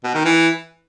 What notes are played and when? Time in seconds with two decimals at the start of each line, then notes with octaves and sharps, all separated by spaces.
0.04 B2
0.14 D#3
0.25 E3